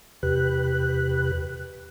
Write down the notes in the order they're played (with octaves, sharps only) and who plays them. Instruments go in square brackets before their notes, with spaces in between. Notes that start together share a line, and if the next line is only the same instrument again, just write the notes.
[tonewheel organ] E2 C3 G4 B4 F#6